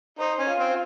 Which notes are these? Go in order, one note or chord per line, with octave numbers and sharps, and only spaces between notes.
D#4 C5
C#4
F4
C4